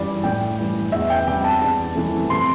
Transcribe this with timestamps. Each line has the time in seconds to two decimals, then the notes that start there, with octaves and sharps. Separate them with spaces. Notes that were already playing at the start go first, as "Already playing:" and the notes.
Already playing: G2 E3 G3 D5
0.24 A2 G5
0.59 E3 G3
0.92 E2 E5
1.10 G5
1.27 C3 G3 G5
1.44 A5
1.61 E2 A5
1.95 C3 E3 A3
2.30 C3 C6